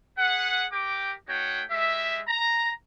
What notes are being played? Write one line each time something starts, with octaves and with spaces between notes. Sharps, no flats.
G#4 B4 F#5
G4 A#4 G5 D6
A3 D#4 F#4 C#5 G5
G#3 G4 E5
A#5